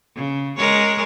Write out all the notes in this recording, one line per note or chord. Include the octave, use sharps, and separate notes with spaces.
C#3
G#3 A#4 C#5